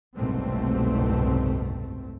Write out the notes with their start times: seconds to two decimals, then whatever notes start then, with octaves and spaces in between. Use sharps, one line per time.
0.15 F#1 C2 G#2 B2 A3 C4